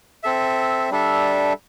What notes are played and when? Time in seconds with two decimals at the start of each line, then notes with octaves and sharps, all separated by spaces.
0.23 C4 A4 E5
0.90 G3 D4 A4 E5